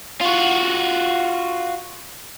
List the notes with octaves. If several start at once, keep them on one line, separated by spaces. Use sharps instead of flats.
F4 F#4